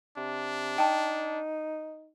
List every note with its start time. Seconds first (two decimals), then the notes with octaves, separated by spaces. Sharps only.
0.17 C3 D4
0.78 D#4 G5 A5